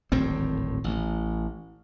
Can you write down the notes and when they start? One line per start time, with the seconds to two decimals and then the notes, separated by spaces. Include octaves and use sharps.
0.12 D1 G#1 A2 C4
0.84 A1